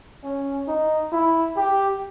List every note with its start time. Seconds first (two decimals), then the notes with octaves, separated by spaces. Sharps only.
0.24 C#4
0.68 D#4
1.12 E4
1.56 G4